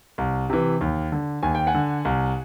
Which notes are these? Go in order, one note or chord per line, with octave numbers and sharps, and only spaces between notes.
C2
C3 E3
D#2
D3
D#2 G#5
G5
F#5 G#5
D3
C2